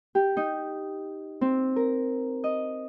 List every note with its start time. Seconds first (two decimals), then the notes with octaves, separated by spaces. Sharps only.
0.15 G4
0.37 D#4
1.41 C4
1.76 A#4
2.44 D#5